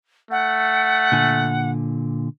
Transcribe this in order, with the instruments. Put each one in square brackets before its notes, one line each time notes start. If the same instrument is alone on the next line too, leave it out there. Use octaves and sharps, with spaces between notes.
[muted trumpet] A3 [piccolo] F#5
[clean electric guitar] A#2 D3 G#5